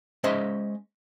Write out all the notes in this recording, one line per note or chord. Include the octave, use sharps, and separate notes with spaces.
G#3 C#4 C5 D#5 E5